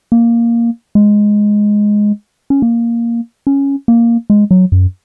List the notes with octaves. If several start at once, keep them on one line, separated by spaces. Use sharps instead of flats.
A#3
G#3
C#4
A#3
C#4
A#3
G#3
F#3
F#2